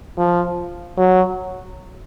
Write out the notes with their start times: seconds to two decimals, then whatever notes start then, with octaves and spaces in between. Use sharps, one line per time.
0.18 F3
0.97 F#3